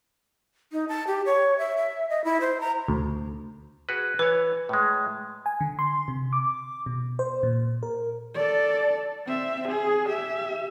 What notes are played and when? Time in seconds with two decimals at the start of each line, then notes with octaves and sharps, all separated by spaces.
0.72 D#4
0.89 A5
1.07 G4
1.26 C#5
1.58 E5
1.77 E5
2.10 D#5
2.24 E4
2.41 C5
2.61 A#5
2.88 D2
3.89 F#4 G#4 B4
4.19 E3 B4 C#5
4.69 A2 G#3
5.46 G#5
5.61 D3
5.79 C6
6.08 C3
6.33 D6
6.86 B2
7.19 C5
7.43 A#2
7.83 A#4
8.34 A4 D5
9.26 C4 E5
9.68 G#4
10.05 G4 E5